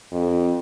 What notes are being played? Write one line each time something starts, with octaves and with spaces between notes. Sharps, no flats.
F2